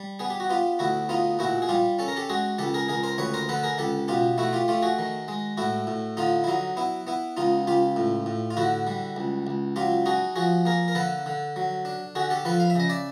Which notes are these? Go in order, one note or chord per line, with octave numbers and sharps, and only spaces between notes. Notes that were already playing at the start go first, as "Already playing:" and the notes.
Already playing: G3
B3 G#4
G4
F#4
B3 F4 G4
D2 E4 F#4
B3 D#4 F4
A#2 E4 F#4
G#4
G3 F4 G4
C#4 A4
A#4
G4 A4
G#3 F#4 G#4
C#2 G4 A4
G#4 A#4
C#2 G#4 A#4
A#4 C5
D2 B4 C#5
A#4 C5
D3 A4 B4
G#4 A#4
C#2 G4 A4
B2 F4 G4
A3 E4 F#4
F4 G4
A3 F4 G4
F#4 G#4
D#3
G#3
A2 E4 F#4
A2
D3 D#4 F4
E4
F#3 D#4
B3 E4
B3 E4
C#2 D#4 F4
C#2 F4 G4
A2
A2
F4
D3 E4 F#4
G3
C#2
C#2
F#3 F4 G4
D#4 F#4 G#4
F3 F#4 G#4
A#3 G#4 A#4
A#4
D3 A4 B4
D3
F#3
D4
D3 F#4 G#4
G4 A4
F3 A4 B4
F5
E5
C#3 D#5
D5 E5